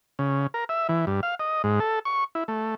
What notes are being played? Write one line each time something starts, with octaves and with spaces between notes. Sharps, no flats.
C#3
A#4
E5
E3
G2
F5
D#5
G#2
A4
C#6
E4
A3